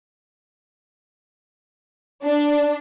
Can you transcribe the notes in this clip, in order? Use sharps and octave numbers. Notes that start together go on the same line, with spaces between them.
D4